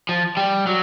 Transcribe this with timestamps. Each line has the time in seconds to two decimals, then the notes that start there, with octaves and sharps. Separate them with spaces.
0.09 F3
0.37 G3
0.67 F#3